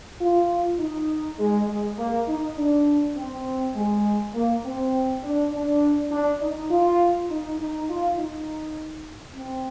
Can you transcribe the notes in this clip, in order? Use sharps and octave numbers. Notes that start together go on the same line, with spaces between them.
F4
D#4
G#3
G#3
A#3
D#4
D4
C4
G#3
A#3
C4
D4
D4
D4
D#4
F4
D#4
D#4
F4
D#4
C4